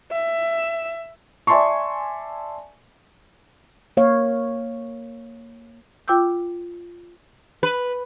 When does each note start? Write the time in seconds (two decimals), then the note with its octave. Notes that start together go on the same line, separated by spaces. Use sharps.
0.12 E5
1.47 D5 E5 G#5 A5 C6 C#6
3.97 A#3 C#5 F5
6.08 F4 G5 D6 E6 G6
7.63 B4